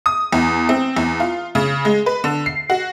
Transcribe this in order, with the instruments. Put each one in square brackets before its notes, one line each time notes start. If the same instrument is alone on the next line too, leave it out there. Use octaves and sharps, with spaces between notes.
[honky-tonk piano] D#6
E2
C4
E2
F4
C#3
G#3
B4
D3
C7
F#4